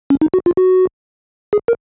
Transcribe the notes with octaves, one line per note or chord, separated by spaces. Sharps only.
C#4
D#4
F#4
F4
F#4
G#4
A#4